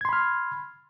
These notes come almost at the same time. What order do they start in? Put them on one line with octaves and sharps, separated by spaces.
G#6 C6 B5 F6